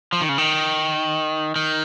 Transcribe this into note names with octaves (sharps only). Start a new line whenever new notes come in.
F3
D#3
C#3
D#3
D#3